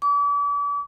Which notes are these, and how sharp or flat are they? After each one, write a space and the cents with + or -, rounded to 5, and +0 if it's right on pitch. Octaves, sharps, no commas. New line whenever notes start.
D6 -40